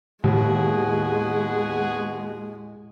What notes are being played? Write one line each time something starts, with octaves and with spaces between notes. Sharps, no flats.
D#2 A2 G#3 B3 F#4 G#4